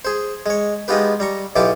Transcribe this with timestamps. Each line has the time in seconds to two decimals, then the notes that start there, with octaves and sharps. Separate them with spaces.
0.05 G#4 C5
0.46 G#3 C#5
0.88 G#3 B3 D#4 F4 G4 B4
1.20 G3 A#5 C#6
1.56 B1 B2 E3 F4 G4 D6